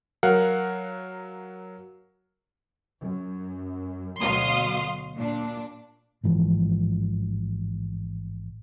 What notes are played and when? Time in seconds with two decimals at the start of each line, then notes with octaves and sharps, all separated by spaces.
0.23 F#3 A#4 F5 F#5
3.01 F#2
4.20 D2 B2 F#3 F5 C6 D#6
5.15 A#2 D4
6.24 A1 G#2 E3 F3